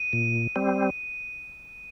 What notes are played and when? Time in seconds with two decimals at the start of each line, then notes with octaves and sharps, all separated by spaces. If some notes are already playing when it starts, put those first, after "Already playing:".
Already playing: D#7
0.13 A#2
0.56 G3 C4